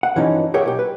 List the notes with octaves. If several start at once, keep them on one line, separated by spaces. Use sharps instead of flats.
F#5
G2 E3 F3 C#4 D#4
G4 G#4 A#4 C#5 E5 F#5
B1 G4
B4